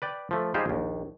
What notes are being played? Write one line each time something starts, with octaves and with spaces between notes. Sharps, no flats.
B4 D5 G5
F3 A3
G3 D#4 F4 G4 G#4 C5
A#1 D#2